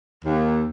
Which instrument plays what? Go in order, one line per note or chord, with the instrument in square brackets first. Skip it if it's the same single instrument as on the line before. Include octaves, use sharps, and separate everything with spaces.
[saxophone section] D#2